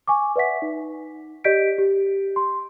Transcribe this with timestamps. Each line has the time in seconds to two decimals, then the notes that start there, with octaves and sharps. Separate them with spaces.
0.08 G#5 C#6 D6
0.36 B4 D5 E5 F#5 B6
0.62 D#4
1.44 G4 D5 D#5 G6 B6 D7
1.78 G4
2.36 C6